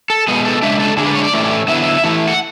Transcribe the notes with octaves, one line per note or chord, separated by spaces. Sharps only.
A4
B2 G#3 B3 G#4
A4
C#3 G#3 D4 E5
A4
D3 G#3 D4 G#4
B4
C#5
D5
A2 E3 A3 C#4
D3 F#3 B3 E4 E5
E3 A3 E4
F#5